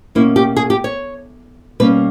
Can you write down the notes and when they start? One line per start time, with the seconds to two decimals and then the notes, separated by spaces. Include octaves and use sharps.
0.15 B2 A#3 C#4 E4
0.36 G4
0.57 G#4
0.70 G4
0.84 C#5
1.80 B2 G3 A#3 C#4 B4